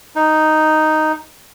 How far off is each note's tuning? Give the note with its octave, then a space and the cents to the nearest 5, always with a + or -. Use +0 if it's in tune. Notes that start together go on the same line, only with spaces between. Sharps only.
D#4 +0